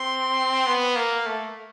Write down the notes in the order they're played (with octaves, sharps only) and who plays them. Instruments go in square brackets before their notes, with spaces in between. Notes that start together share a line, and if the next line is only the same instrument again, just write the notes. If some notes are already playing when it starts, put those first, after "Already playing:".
Already playing: [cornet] C4 [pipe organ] C6
[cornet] B3
A#3
A3